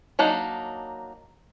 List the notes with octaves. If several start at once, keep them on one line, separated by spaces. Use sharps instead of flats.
F#3 A#3 D4 D#4